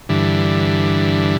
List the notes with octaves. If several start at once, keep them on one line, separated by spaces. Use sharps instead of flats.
G2 D3 E3